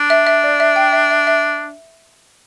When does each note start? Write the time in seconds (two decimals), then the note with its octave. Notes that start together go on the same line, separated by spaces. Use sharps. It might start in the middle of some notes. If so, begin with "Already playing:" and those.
Already playing: D4
0.10 E5
0.27 E5
0.44 D5
0.60 E5
0.76 G5
0.93 E5
1.11 E5
1.27 E5